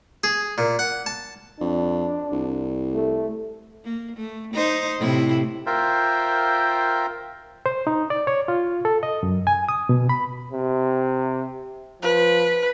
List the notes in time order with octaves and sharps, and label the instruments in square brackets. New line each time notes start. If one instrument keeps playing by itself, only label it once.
[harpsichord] G#4
A#2
F#5
A5
[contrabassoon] F2 [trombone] D4
[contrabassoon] C2
[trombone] A3
[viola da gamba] A#3
A3
D#4 C5
A2 C3 E4
[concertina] F4 A#4 C5 E5 G5
[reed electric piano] C5
D#4
D5
C#5
F4
A4
D#5
F#2
G#5
D#6
B2
B5
[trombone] C3
[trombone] F3 [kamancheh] B4